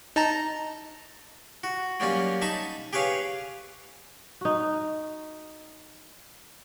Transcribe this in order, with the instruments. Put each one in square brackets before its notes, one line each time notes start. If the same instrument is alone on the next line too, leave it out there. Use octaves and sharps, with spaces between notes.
[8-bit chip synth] D#4 A5 A#5
[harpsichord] F#4
F#3 G3 A#3 C#4
D#4 A5 B5 C#6
G4 G#4 B4 C#5 F5
[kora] D#4 F#4